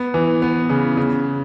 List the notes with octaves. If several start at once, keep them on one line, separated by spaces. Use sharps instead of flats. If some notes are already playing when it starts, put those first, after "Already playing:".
Already playing: B3
E3
B3
C#3
C#3